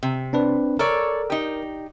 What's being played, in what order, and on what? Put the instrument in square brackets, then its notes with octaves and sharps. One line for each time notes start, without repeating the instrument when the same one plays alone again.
[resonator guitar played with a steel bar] C3
[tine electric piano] C4 D4 B4
[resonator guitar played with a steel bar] A4 C#5 D5 [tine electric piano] A#4
[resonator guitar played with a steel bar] D#4 G4